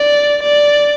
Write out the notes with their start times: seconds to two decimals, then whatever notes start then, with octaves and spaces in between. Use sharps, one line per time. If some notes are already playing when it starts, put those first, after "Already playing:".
Already playing: D5
0.42 D5